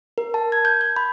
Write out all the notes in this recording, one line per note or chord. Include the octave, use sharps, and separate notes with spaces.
A#4
A5
G#6
G6
G6
B5